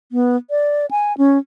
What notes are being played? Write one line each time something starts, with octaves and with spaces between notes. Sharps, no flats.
B3
D5
G#5
C#4